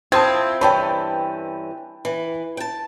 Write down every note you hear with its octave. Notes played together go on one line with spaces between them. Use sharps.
C4 E4 F4 A5 D#6 G#6
G2 E3 C#4 G5 A5 B5
E3
G5 A5